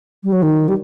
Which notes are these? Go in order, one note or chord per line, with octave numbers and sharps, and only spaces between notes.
G3
F#3
D#3
G3